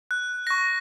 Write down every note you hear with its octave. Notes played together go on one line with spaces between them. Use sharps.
F#6
C#6 A#6